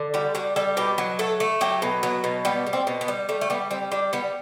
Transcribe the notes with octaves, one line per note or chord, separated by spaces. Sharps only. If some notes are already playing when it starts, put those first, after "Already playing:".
Already playing: D3
G3 F#4
G3 F#4
G3 A4
B2 G4
F#3
A3 A4
A3
F#3 G4
B2
F#3 B3
B2
G3 B3
G3
C4
B2
B3
G3
G3 A3
A3
G3 B3
G3 C4
G3 D4
G3 B3